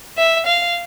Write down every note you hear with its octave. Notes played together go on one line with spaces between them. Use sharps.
E5
F5